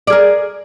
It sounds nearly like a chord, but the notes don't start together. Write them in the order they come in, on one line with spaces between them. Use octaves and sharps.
D5 G#4 A#4